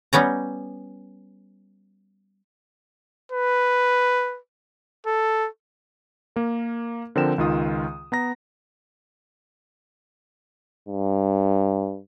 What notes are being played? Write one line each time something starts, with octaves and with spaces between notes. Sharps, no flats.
G3 B3 C#4 A#5
B4
A4
A#3 A#4
D3 F3 C4 A#4 G5 E7
C#2 D#3 F4 D#6
B3 A#5 A#6
G2